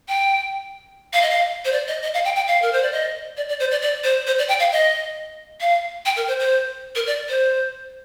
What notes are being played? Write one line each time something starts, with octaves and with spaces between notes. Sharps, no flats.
G5
F5
D#5
F5
C5
D5
D#5
D#5
F5
G5
G5
F5
A#4
C5
D5
D#5
D5
D5
C5
D5
D5
C5
C5
D5
G5
F5
D#5
F5
G5
A#4
C5
C5
A#4
D5
C5